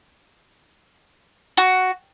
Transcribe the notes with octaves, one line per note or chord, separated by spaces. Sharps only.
F#4